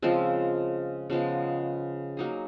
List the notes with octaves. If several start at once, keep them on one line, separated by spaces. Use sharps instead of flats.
C#3 F3 G#3 C4
C#3 F3 G#3 B3
F#3 A#3 D#4 G#4